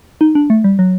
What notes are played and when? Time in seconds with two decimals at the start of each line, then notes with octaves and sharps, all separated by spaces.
0.21 D#4
0.35 D4
0.50 A3
0.64 G3
0.79 F#3